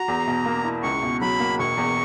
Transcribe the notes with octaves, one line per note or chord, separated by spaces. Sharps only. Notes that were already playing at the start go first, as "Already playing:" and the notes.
Already playing: F#4 A#5
E2
B2
A#3
E4
C#2 C#6
B2
F#3 B5
A#3
E1 C#6
E2